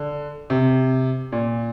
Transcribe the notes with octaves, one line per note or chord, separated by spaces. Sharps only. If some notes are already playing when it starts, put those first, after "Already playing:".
Already playing: D3
C3
A#2